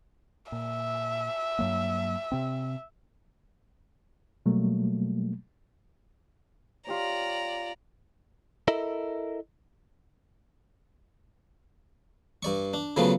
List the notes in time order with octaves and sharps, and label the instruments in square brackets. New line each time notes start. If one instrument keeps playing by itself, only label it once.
[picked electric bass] A#2 [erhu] E5
[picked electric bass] G2 F#3 A#3
C3 C4
[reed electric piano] B2 F#3 G3 A3 A#3
[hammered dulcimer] F4 G4 C#5 [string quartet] D5 A#5
[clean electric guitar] E4 A4 A#4 D#5 E5
[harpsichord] G2 D5 C#6
D4
C#3 F3 F#3 A3 B3